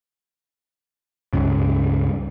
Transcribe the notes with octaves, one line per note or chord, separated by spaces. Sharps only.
C#2 G2 C#3